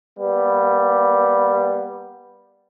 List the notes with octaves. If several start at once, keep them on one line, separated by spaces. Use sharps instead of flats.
G3 A#3 B3